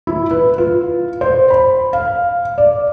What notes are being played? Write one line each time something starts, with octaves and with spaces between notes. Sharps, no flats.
E4
B4
F4
C5
B5
F5
D5